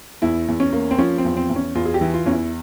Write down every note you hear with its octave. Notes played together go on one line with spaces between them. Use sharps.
E2 E4
E2
C#4
A#3
C4
F3 C#4
C4
E2
C4
E2
C#4
E2 F4
G#4
G4
E3
F4
E2 C#4
E4